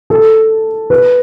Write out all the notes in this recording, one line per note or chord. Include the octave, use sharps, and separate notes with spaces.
A4
B4